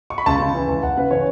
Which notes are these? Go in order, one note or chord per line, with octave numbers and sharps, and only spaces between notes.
C#6
B5
C#2 A5
C#3
E3
C#2
C#2 F#5
C#3 B4
E3 C#5